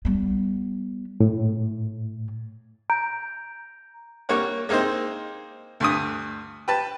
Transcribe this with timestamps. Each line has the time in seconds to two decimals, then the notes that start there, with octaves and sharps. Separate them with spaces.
0.05 G3 B3
1.20 A2
2.90 A#5 G6 D7
4.29 G3 A#3 C#5 F#5
4.69 G#3 A#3 C4 D#4 C5
5.80 D2 G2 D#6
6.68 G4 B4 A5